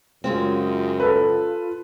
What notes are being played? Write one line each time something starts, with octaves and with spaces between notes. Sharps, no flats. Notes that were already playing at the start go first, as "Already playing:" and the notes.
F#2 C#3 G#3 C4 F4
A4 B4